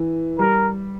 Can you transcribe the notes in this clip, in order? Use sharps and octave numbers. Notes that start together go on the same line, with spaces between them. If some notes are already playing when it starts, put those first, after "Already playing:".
Already playing: E3
G3 A#4